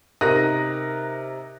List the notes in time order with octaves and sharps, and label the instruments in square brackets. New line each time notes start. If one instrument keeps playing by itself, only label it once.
[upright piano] C3 D#4 A#4 F#6 A#6 D#7